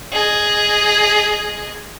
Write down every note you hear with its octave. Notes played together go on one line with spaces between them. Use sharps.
G#4 D#5